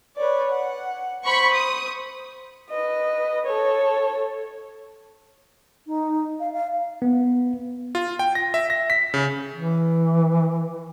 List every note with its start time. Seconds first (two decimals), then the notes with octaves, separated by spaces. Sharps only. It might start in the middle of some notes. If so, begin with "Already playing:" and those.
0.16 B4 C#5 D5
0.52 F#5
1.25 C5 B5 C#6
1.53 D#6
2.70 B4 D#5
3.46 A4 C#5
5.87 D#4
6.40 F5
6.53 F5
7.02 B3
7.95 F4
8.19 G5
8.35 A#6
8.54 E5
8.70 A#6
8.90 B6
9.14 C#3
9.55 E3